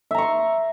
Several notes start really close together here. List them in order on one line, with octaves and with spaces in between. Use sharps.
E5 A#5 C#6 C6